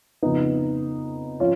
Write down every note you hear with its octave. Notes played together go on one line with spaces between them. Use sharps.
F2 C#3 F3 B3 D#4
F3 C#4 F4